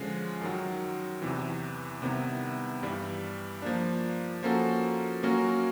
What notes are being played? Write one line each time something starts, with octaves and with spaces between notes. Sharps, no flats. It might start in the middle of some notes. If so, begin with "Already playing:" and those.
Already playing: D3 F3 G#3 C#4
F#2 D#3 F#3
E2 C3 E3
C3 D#3 G3 B3 E4
G2 E3 G3
F3 A#3 D4
F3 A#3 C#4 F#4 A4
F#3 A#3 C#4 F#4 A#4